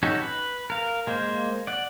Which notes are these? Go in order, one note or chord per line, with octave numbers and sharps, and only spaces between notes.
C#4 D#4 F#4 G4 A4
B4
A#4 F5
G#3 A#3 C5
D5 F#5